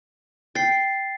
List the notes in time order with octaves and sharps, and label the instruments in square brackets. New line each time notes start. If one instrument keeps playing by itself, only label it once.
[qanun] G5 [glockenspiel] A6 C7